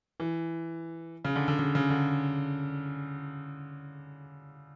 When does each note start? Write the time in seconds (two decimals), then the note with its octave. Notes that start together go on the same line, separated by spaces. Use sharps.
0.20 E3
1.25 C#3
1.36 D3
1.48 D3
1.59 C#3
1.75 C#3
1.90 D3